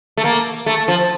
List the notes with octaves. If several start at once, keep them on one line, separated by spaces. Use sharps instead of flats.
A3
A#3
A3
F3